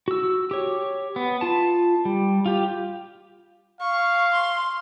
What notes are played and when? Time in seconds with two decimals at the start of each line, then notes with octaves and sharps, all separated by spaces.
0.08 F#4 E6
0.51 G4 C#5
1.16 B3
1.41 F4 A5
2.05 G3
2.46 F4 G4
3.81 F5 C#6
4.33 C6